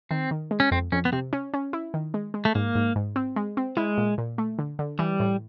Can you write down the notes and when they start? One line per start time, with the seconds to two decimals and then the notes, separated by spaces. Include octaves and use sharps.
0.11 D#3 C4
0.31 D#3
0.51 G#3
0.60 C#4
0.72 F2 C4
0.92 F2 C#4
1.05 B3
1.12 C3 C4
1.33 C#4
1.54 C#4
1.73 E4
1.94 D#3
2.14 G#3
2.34 G#3
2.45 A3
2.55 G#2 A#3
2.75 G#2
2.96 G#2
3.16 C4
3.36 G#3
3.57 C4
3.77 G#3 E4
3.98 A#2
4.18 A#2
4.38 A3
4.59 D3
4.79 D3
4.99 E3 G3
5.20 A2